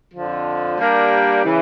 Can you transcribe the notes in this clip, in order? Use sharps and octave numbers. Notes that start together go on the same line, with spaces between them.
F2 D3 F3
G3 A#3 D4 G4 A#4
C#3 E3